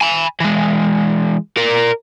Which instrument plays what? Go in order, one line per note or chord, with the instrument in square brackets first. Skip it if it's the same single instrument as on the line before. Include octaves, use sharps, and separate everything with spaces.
[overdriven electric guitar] G#5 B5
E3 G#3
A#4 D5